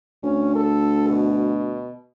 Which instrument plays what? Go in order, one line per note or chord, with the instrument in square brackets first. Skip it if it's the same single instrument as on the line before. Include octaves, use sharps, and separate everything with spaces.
[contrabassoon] D2 [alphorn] C#4
[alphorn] A4
B2